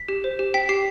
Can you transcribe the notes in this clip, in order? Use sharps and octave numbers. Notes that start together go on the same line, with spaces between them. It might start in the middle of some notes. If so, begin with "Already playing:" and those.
Already playing: B6
G4
C5
G4
G5 B6
G4 C7